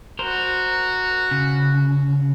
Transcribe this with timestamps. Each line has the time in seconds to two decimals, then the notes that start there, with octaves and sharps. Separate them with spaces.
0.19 F#4 A#4 C5
1.31 C#3